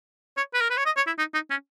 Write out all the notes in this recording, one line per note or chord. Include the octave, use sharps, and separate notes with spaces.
C#5
B4
A#4
B4
C#5
D#5
C#5
E4
D#4
D#4
C#4